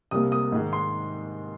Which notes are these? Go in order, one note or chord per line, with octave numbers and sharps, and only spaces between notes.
C2 C3 G3 A#3 D#6
D#6
G#2 D#3 G#3
C6